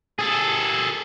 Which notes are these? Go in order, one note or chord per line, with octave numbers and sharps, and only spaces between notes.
G#4 A4